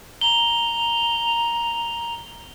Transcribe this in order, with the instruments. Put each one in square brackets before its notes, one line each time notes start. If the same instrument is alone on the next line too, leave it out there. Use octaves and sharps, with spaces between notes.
[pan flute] A#5 [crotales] G7